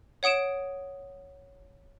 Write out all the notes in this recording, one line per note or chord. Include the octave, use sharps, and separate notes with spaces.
C#5 F#5 D#6 D7 E7